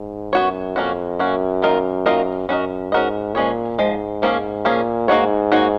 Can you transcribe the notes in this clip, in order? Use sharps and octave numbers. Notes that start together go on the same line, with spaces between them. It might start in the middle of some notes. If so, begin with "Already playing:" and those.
Already playing: G#2
F#2 B3 F#4 C#5
F2 A#3 C#4 F#4
F#2 A#3 C#4 F#4
D#3 A#3 F4 A#4 D#5
D#3 A#3 F4 A#4 D#5
F#2 C#4 F#4 A#4 D#5
G#2 C#4 F#4 A#4 D#5
A#2 F3 G#3 C#4 G#4 C#5
G#2 F3 G#3
F3 A#3 C#4 G#4
A#2 F3 A#3 C#4 G#4
G#2 A#3 D#4 F#4 C#5
A#3 D#4 F#4 C#5